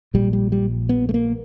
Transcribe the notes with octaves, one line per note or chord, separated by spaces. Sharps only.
A#1 A#2 G3
G3
G3
B3
A3
A#3